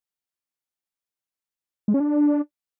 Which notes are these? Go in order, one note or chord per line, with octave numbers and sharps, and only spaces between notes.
G#3
C#4
D4